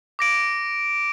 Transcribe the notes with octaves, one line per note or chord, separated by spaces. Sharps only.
D6 A#6 D7